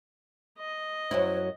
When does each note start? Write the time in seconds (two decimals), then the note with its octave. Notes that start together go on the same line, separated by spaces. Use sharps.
0.59 D#5
1.11 F#2 F#3 E4 C5 C#5